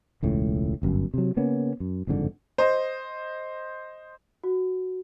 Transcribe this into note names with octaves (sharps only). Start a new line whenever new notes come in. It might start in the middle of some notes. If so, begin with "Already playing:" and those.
E1 C#2 A2
D1 G1 F#2
C3 F#3
C#3 A#3 B3 C#4
F#2
F#1 F2 G#2 D3
C5 D#5
F#4